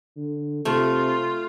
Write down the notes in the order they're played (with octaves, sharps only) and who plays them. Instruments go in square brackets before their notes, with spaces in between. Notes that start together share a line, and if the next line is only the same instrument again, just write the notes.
[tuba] D3
[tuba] C3 [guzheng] A3 [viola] F4